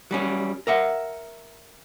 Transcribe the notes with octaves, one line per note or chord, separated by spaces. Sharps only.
F#3 G3 C#4
A#4 E5 F#5